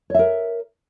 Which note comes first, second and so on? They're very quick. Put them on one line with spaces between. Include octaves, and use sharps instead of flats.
C#5 E5 A#4